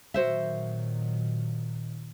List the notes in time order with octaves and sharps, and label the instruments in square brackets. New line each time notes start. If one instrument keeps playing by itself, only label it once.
[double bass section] A#2 D#3 F#3 [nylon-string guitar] F#4 C5 E5